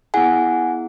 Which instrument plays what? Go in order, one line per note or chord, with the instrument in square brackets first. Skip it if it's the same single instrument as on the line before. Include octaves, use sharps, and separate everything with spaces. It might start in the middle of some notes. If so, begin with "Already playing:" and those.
[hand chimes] B3 E4 G#4 F#5 G#5